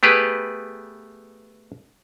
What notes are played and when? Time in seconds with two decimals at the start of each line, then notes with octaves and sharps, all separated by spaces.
0.03 A3 B3 G4 G#4 B4